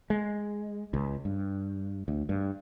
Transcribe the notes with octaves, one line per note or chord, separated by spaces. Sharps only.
G#3
C#2
G2
D2
G2